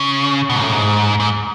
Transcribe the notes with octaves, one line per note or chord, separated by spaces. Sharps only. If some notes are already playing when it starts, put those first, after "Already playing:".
Already playing: C#3
B2
G#2
A2
G#2
G#2